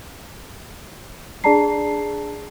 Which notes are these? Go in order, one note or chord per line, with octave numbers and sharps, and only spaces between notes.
D4 G#4 D5 A5 A#5 C7